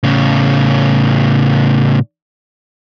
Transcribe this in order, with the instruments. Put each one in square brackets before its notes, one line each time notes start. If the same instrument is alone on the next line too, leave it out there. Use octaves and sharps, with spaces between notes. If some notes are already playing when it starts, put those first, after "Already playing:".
[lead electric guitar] A2 C#3